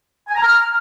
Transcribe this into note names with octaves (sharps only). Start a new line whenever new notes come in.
G#5
A#5
F6